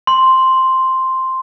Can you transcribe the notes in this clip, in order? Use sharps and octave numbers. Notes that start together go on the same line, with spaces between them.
C6